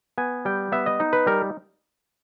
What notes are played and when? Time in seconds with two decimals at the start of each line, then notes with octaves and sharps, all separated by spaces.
0.18 B3 G#5
0.45 G3 G5
0.72 B3 E5
0.86 D#5
1.00 D#4
1.13 B4
1.26 G3 A#4